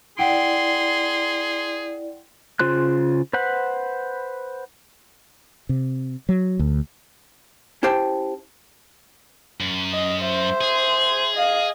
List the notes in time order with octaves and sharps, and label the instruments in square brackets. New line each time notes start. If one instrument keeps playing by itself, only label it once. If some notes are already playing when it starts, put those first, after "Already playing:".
[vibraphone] E4 D5 [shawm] G#4 [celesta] F#5 G5 D7 [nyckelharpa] C6
[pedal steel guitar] C#3 F4 C5 C6 F#6
B4 C5 F#5 B5
[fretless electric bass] C3
F#3
D2
[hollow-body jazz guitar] C#4 E4 G4 C5 G5 A5
[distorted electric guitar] F#2
[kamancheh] D#5
C5 E5
[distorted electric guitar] G#4
[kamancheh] D#5 F5